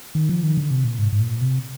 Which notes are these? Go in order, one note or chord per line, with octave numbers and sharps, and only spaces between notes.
D#3
F3
D#3
D3
C3
A#2
G#2
G#2
A#2
C3